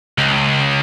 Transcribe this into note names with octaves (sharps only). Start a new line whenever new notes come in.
C#2